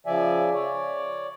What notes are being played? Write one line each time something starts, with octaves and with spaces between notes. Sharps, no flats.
C#3 F3 D5 E5 G#5
C#5 D5